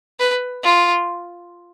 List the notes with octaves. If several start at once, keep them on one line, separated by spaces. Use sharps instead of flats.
B4
F4